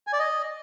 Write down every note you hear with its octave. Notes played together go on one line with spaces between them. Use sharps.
G#5
D5
D#5